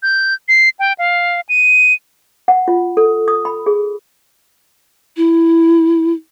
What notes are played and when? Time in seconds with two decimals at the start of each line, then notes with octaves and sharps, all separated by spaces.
0.03 G6
0.48 C7
0.79 G5
0.99 F5
1.49 D#7
2.48 F#5
2.68 F4
2.97 A4
3.28 D#6
3.45 B5
3.66 G#4
5.17 E4